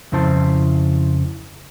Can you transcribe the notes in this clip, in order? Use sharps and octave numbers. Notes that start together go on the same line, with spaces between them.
F2 C#3 E4 C5 A5